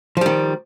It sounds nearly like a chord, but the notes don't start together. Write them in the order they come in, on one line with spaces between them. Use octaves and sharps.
F3 G3 D#3